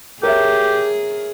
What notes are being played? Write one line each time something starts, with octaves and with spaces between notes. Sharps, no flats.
G4 G#4 A#4 C#5 E5